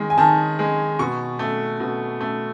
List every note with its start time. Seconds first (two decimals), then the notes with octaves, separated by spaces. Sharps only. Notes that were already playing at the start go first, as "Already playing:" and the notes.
Already playing: D#3 G#3
0.10 G#5
0.18 D#3 A5
0.59 G#3
0.99 B2 C#6
1.39 A3
1.80 B2
2.21 A3